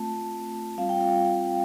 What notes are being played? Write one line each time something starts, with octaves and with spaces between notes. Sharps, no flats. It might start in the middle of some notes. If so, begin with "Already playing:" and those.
Already playing: A3 C4 F4 A5
G3 C4 F4 F5
G5
F5